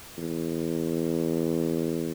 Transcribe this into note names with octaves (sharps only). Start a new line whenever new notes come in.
E2